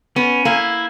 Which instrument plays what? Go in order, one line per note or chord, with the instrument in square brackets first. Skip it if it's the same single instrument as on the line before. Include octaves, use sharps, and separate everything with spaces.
[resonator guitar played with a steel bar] B3 [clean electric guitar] C#4
[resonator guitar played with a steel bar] A#3 [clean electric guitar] E4